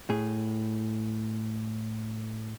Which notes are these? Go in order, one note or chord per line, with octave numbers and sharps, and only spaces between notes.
A2 G#4